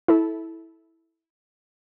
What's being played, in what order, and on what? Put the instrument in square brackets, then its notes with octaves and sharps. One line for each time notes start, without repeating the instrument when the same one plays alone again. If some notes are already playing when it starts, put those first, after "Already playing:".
[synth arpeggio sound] E4 A4